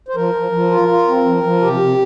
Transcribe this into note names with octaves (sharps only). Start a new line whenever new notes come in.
C5
F3 A#4
F3
F3
F4
F4
C4
F3
F3
C3 G4
C3